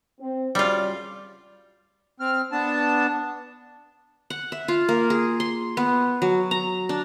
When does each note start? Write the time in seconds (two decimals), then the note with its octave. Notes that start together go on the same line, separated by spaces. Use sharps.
0.20 C4
0.55 C#3 G3 F4 F#4 D5
2.20 C4 F6
2.52 B3 D4 A5
4.30 F#5
4.52 E5
4.68 F4
4.89 A#3
5.10 G#4
5.40 C6
5.77 B3
6.22 F#3
6.51 A#5
6.89 D4